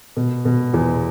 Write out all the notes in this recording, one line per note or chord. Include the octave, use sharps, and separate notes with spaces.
B2
B2
E2